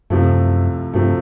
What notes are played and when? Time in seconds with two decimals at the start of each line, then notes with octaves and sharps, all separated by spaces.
0.10 C2 F#2 C3 F3 A3
0.94 G2 C3 F3 A3